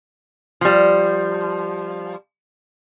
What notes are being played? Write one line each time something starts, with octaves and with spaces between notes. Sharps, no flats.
F3 G3